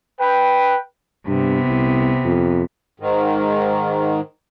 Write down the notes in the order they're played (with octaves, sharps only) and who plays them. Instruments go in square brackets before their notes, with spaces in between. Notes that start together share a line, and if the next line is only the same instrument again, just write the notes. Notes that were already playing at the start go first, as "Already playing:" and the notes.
[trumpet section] B4 G5
[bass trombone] G2 [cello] C3 B3
[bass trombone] C2
F2
[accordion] G#2 D#3